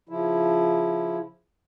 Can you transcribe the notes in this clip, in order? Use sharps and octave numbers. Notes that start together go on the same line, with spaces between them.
C#3 F3 E4